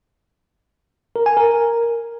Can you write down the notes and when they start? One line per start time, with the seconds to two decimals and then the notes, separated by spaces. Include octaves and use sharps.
1.16 A#4
1.26 G#5
1.37 A#4